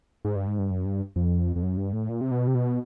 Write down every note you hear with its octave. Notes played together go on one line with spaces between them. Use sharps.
G#2
G2
G#2
G2
F#2
G2
F2
F2
F#2
G2
A2
A#2
C3
B2
C3
B2